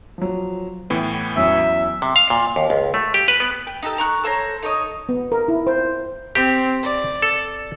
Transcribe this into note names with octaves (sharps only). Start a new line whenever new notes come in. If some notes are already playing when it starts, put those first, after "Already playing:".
F3 F#3
A2 E3 B3 G5
E2 F#3 C#4 E5
C3
F5
A#2
D#2
C#2
A3
G4
B4
B3
G5
D#4 G4 A4
A#5 C#6 F#6
A4 C5 C#5 A#5
D#4 A4 C#5 D#5
B3
A#4
E4
C5
C4 G4
D5
A4